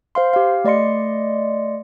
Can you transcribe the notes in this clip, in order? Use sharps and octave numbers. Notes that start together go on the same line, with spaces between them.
C5 F5 C6
G4 F5
A3 D5 D#5 C6 C#7